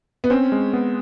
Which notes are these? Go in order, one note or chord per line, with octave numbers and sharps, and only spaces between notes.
B3
C4 C#4
G#3
B3